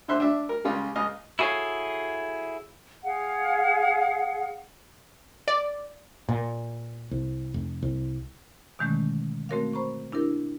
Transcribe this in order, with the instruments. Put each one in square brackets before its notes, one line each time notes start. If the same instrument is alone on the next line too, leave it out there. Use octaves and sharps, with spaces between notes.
[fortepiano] D3 C5 E5 C6 F#6
D4 E5
A#4
C#2 C#3 G3 F4
C#2 D#5 F5 F6
[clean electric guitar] E4 F#4 G#4 A4 C#5 F5
[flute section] G#4 F5 F#5
[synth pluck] D5
[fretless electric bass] A#2
C2
F1
C2
[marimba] B2 D3 D#3 G#3 A3 C#4
A3 C4 F#4 A#4 C#5 F5
C5 A#5 B5 C#6
D4 E4 G4 A#4